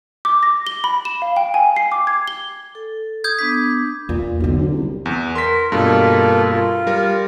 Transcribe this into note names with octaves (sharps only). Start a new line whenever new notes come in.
D6
A#6
G7
B5
E7
F5
G5
G#5
C7
D6
G#6
G7
A4
D#6 G6 G#6
B3 D4 D6 B6
E2 A#2
B1 D3 F#3
D2
C2
E2
A#4 C6 B6
G2 B2 A#3 F4 A4
F4
G3 A#4